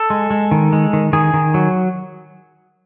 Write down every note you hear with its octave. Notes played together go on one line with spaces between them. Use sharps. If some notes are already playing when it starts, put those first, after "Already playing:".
Already playing: A4
G#3
G#3
D#3
G#3
D#3
D#3 G#4
D#3
F#3